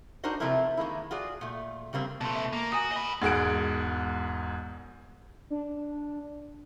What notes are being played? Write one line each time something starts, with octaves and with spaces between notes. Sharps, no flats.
D4 D#4 F#4 A#4 C5 D#5
C3 F3 A3 C4 E4 A#4
D#3 G#3 A#3 E4
F4 F#4 G#4 D5
A#2 A3
C#3 G3 A#3 C4
B2 A3 A5 C6
E5
A#3
F#4 G#5 A#5 D#6
D#5 B5
E1 G#2 G#4 F#5 D7
D4